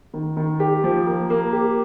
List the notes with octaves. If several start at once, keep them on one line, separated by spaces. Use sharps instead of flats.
D#3
D#3
G4
F3
A#3
A#3
G4